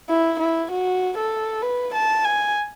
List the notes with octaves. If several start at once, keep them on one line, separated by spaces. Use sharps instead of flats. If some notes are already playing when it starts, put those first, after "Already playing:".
E4
E4
F#4
A4
B4
A5
G#5